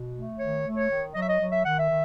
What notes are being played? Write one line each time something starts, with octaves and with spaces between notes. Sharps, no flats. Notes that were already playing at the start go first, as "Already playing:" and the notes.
Already playing: B2
A3
D#3 C#5
A3
C#5
D#3
F#3 D#5
E5
D#5
F#3
E5
D#3 F#5
E5
D#3